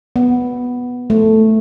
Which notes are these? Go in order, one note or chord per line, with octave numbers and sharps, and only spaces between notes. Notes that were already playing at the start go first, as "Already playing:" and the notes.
B3
A3